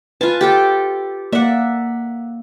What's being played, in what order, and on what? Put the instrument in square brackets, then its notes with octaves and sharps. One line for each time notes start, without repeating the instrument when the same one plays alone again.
[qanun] F4 G#5 A5 [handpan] B4
[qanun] G4 A4 G5
[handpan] A#3 D5 [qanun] E5 F#5